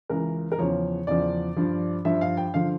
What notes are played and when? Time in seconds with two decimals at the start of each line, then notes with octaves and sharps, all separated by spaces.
0.09 C#2 C#3 E3 A#4
0.52 A#4
0.58 E2 C#3 F3 C#5
1.07 E2 C#3 F3 D5
1.57 G2 F3
2.05 G2 F3 E5
2.21 F5
2.37 G5
2.54 D3 F3 F5